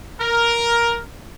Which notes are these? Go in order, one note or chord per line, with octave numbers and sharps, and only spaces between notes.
A#4